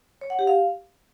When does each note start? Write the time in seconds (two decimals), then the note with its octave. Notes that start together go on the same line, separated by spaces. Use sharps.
0.21 C#5
0.30 F#5
0.39 G4
0.47 F5